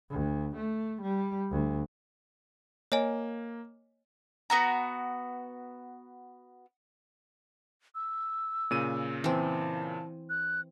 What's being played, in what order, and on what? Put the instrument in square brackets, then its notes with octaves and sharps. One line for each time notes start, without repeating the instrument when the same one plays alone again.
[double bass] D2
A3
G3
D2
[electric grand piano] A#3 [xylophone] C#5 D#5 G#5
[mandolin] B3 F#4 A#5
[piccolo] E6
[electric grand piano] A#2 C#3 D#7
[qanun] E3 C4 [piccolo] A5
[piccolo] F#6